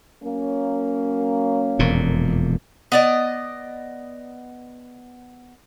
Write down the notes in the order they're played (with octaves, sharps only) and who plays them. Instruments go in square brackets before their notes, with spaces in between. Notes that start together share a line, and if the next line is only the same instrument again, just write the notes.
[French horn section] F#3 A#3 C#4
[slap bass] E1 F2 A#2
[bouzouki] B3 D5 D#5